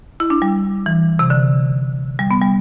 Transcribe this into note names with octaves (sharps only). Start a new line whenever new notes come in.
E4
D4
G3
E3
C3
D3
G3
B3
G3